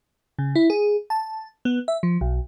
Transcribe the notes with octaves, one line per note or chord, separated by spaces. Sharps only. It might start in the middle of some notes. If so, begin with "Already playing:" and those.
C#3
E4
G#4
A5
B3
E5
F3
B1